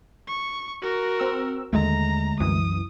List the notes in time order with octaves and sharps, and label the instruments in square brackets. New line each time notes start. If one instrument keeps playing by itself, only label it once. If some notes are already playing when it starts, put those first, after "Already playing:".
[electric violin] C#6
F#4 A#4
[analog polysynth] C4 E6
[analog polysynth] D#2 [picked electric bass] D3 G#3 A3 [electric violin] A#5
[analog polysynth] C2 F#2 E3 [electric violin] D#6